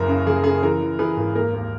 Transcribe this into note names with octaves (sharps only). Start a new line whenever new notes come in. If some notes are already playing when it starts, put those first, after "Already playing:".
Already playing: F#1 F#2 A#4
C#3
F#1 G#4
C#3 G#4
E3 A#4
E3
E3 G#4 B4
G#1
A#3 A#4
D#2